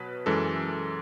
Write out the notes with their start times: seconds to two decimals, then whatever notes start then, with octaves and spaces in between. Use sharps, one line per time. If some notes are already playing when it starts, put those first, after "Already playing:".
Already playing: B2 F#3 B4
0.26 F#2 E3 G#3 A4